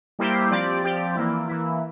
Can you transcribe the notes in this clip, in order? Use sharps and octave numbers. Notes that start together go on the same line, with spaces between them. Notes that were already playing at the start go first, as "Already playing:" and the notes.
G3 A#3 E4 G4 C5
F3 C4 G4 D5
F3 C4 G4 D5
E3 A#3 E4
E3 A#3 E4